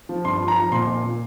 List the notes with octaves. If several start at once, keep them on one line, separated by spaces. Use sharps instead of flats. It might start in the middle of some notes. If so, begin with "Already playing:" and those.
F3
G2 C6
F3
A#5
F3
A#2 C6
A#2
A#2